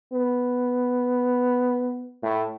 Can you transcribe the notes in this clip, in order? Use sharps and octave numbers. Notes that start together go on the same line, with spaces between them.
B3
A2